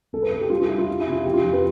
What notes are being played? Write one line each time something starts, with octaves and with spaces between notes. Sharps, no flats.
C2 A4
B4
C2 A4
G4
G3 F4
F4
G3 E4
F4
G3
E4
C3
F4
F2 G4
F4
F2 G4
B4